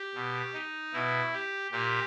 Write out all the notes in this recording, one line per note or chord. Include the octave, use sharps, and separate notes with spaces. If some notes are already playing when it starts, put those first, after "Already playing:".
Already playing: G4
B2
D#4
B2 E4
G4
A#2 G4